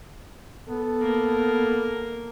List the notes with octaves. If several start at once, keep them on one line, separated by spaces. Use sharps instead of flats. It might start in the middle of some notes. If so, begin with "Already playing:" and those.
B3 A4
A#3 A#4